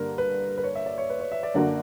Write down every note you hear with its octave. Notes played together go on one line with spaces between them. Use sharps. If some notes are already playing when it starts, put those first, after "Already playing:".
Already playing: G2 D3 A#3 A#4
B4
B4
C#5
E5
D5
C#5
B4
C#5
E5
D5
F#2 D3 A#3 D4 F#4 D5